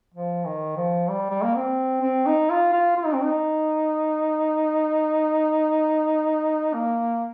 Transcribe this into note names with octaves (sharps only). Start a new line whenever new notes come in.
F3
D#3
F3
G3
G3
A#3
C4
C4
D#4
F4
F4
F4
D#4
C4
D#4
A#3